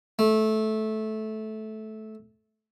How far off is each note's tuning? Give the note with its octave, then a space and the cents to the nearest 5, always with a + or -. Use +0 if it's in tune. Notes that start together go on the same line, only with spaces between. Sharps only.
A3 -15